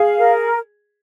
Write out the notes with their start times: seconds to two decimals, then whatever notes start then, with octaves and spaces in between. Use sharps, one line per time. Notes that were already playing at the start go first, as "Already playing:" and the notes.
Already playing: G#4 F5
0.18 A#4